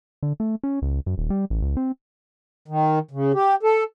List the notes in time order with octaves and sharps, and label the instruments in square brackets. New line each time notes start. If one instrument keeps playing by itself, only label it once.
[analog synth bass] D3
A3
C#4
C#2
F#2
D#1
G3
A1
C#2
C4
[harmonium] D#3
C#3
G4
A4